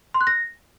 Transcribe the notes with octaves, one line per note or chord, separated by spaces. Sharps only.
C6
F#6
A#6